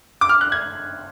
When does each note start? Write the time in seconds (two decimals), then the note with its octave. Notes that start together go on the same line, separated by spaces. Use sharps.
0.21 D6
0.29 F6
0.41 F#6
0.52 G#6